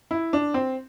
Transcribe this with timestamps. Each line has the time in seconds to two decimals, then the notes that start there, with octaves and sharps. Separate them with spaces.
0.11 E4
0.33 D4
0.54 C4